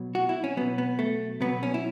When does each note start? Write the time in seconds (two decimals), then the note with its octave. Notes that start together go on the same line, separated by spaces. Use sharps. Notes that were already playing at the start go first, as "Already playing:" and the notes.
Already playing: B2 F#3
0.15 F#4
0.29 E4
0.44 C#4
0.57 B2 F#3 B3
0.78 B3
0.99 A3
1.41 B2 F#3 B3
1.63 C#4
1.74 E4